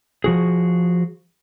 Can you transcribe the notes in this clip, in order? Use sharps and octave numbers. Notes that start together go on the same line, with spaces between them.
F3 F#4 G#4